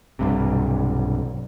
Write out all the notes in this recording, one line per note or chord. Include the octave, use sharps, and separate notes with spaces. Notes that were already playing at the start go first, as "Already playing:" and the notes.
B1 G2 C3